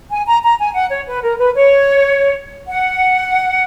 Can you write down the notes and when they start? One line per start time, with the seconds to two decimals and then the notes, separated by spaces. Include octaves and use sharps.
0.11 G#5
0.26 A#5
0.43 A#5
0.59 G#5
0.74 F#5
0.90 C#5
1.07 B4
1.23 A#4
1.39 B4
1.55 C#5
2.68 F#5